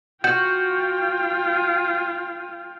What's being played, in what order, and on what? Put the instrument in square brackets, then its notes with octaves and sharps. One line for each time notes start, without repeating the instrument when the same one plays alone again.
[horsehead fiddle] F4 G5 [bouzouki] F#4 [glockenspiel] G6